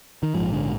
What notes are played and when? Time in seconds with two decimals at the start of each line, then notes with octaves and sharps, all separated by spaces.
0.23 D#3
0.35 A#1 G#2 F3
0.52 D3